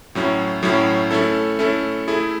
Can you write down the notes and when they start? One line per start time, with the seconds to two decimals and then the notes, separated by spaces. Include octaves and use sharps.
0.15 A2 F#3 C#4 E4
0.63 A2 F#3 C#4 E4
1.11 A3 C#4 E4 A4
1.59 A3 C#4 E4 A4
2.08 A3 E4 G#4